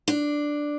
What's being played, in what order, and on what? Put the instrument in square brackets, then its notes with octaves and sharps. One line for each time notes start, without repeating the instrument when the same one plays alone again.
[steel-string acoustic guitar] D4